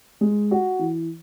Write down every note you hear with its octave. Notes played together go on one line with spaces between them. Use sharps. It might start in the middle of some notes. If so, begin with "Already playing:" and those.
G#3
F#4
E3